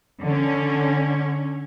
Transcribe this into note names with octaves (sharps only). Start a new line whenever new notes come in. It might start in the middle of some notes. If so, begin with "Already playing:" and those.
D3 C#4